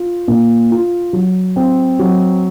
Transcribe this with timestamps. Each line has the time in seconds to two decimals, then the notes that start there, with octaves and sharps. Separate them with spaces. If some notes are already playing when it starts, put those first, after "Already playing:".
Already playing: F4
0.28 A#2
0.71 F4
1.13 F#3
1.56 C4
1.99 F#3